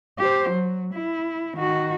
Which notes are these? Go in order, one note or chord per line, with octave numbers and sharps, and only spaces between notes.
G4 C5
F#3
E4
D#3 F#4